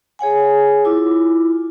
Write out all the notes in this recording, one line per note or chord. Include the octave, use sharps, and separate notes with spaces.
G#4 C#5 F#5 G#5
E4 F4 D6